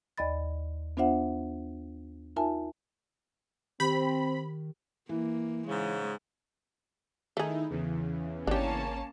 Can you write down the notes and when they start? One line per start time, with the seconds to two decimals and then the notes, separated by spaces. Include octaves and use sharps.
0.18 D#2 D5 D#5 B5 A6
0.97 B3 D4 F4 C5 E5 F#5
2.36 D#4 F4 A#4 E5 G#5 A5
3.80 D#3 C4 G4 B5
5.09 E3 A#3
5.68 G#2 C#3 G#3
7.37 D#3 A3 D#4 E4 G#4
7.70 E2 C#3 E3
8.47 G#1 A#3 C#4 D4 G4 A5